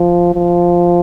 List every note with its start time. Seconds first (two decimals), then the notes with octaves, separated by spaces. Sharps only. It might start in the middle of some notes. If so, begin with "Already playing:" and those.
Already playing: F3
0.34 F3